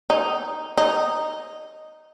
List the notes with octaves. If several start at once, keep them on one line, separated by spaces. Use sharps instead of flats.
D#4
D#4